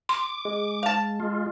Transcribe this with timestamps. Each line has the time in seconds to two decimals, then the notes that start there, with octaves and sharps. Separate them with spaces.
0.09 C6 D6
0.45 G#3
0.83 F5 A5
1.20 G#3 F4